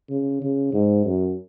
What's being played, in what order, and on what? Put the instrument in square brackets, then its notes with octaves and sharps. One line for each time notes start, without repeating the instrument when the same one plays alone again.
[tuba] C#3
C#3
G#2
F#2